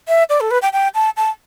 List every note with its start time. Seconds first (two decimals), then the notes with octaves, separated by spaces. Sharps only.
0.08 E5
0.30 D5
0.41 A4
0.51 B4
0.62 G5
0.73 G5
0.95 A5
1.17 A5